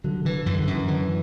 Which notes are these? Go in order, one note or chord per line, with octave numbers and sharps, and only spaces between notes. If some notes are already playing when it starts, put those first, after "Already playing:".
D3 F#3
D3 E3
F#2 E3
D3
F#2
E3
D3 E3